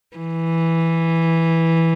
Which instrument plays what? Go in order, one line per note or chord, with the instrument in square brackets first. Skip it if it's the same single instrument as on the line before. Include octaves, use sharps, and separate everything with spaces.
[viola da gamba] E3